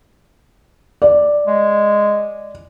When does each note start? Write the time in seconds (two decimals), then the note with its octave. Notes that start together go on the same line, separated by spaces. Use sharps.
1.02 D5
1.47 G#3